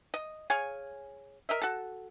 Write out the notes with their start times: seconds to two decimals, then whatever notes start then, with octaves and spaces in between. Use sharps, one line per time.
0.14 D#5
0.50 G#4 C#5 F5 G#5
1.49 A#4 D#5 E5
1.62 F#4 A4